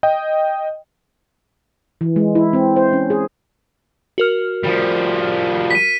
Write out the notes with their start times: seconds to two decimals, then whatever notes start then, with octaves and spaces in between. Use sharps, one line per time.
0.03 D#5 G5
2.01 E3
2.16 G#3
2.35 E4
2.53 C4
2.76 C5
2.93 C#4
3.10 G#4
4.18 F#4 A#4 F6
4.63 F3 G3
5.71 B6 D#7